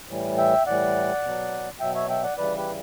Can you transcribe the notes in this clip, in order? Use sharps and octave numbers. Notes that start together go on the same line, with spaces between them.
A2 E3 G3
E5 G5
A2 E3 G3 D5 F#5
B2 F#3
B2 F#3 E5 G5
C#5 E5
E5 G5
D5 F#5
C#3 E3 G3 B4 D5
G4 B4